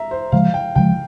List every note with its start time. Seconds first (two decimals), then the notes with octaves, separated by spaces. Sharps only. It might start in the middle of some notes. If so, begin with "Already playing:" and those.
Already playing: E5 A#5
0.11 C5
0.32 C#3 F3 G#3 F5
0.54 G5
0.75 C#3 F3 G#3 G5